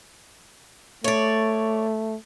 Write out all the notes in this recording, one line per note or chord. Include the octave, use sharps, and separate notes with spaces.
A3 C#5 D5